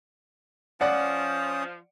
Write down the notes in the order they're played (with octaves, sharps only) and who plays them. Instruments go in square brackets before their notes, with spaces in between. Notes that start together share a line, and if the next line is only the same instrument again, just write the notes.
[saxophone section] F3 [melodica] C#4 D#6 [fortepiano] D5 F#5